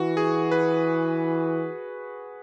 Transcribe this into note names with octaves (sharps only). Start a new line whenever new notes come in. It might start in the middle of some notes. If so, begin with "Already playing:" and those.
Already playing: E3 F#4
G#4
B4